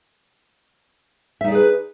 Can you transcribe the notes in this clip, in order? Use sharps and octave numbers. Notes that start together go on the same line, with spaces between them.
D#4 G#4 B4 D5 E5